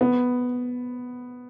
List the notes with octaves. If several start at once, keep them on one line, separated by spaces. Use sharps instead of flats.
B3